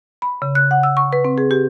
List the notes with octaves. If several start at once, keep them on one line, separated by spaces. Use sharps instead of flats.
B5
C#3
F#6
F#5
E6
C#6
B4
C4
G#4
G4